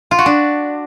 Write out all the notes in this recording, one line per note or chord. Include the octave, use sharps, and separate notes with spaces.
F4
F#4
D4